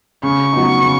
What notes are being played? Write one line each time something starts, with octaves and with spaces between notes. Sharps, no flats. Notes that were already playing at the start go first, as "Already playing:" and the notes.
C#3 C#6
F#3 B3 D#4
C#3